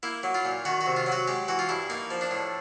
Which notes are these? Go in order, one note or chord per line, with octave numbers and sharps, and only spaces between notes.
A#3 E4
F#3
F4
A#2
D#3 F#4
F#4
C3
F4
F#3
F#4
G#3 G4
E3 F#4
F4
G2 E4
A#3 D#4
F3
D4
A2